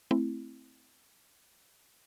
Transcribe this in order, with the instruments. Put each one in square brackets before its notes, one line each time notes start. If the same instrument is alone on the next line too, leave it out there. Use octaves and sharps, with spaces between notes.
[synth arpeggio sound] A3 C4 E4